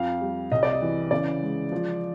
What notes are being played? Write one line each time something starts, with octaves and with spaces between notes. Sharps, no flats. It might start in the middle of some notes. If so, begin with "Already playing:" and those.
Already playing: F2 F5
G3
C2 D#5
D5
D#5
E3
C#3 D5
G#3
F3